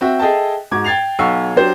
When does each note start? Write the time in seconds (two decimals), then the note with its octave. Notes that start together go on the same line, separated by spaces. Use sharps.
0.01 C4 F#4 E5
0.19 G#4 A4 D#5 E5 G5 A5
0.71 G#2 F#4 D6 G#6
0.84 G5 G#6 A6 C7 F7
1.19 B1 F5 F#5 C#6 E6 C7
1.56 F#3 D4 G4 C5